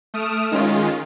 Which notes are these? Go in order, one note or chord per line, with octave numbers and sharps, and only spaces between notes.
A3 D#6 F6 D7 E7
D#3 G#3 C#4 F4